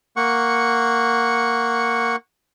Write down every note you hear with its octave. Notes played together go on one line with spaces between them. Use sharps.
A#3 F#5 C#6